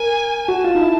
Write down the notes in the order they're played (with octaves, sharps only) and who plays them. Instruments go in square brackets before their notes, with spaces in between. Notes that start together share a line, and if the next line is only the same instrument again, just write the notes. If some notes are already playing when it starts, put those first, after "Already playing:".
Already playing: [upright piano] A#4 [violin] G#5
[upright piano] F#4 [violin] A5
[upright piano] F4
D#4
E4